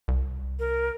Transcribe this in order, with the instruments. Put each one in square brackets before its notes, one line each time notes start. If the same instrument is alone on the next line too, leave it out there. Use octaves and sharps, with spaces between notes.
[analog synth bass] C2
[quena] A#4